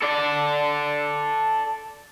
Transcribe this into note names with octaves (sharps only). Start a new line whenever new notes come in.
A4 D5